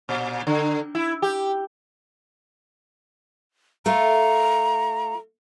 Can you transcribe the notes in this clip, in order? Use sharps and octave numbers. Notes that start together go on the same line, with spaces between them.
A#2
D3
E4
G4
A3 F4 A#5